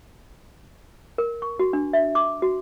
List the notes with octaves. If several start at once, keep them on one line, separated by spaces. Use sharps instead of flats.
A#4
C#6
F#4
D4
E5
D6
F#4